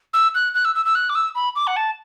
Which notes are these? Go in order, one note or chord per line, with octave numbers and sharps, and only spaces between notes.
E6
F#6
F#6
E6
E6
E6
F#6
D6
E6
B5
D6
F#5
A5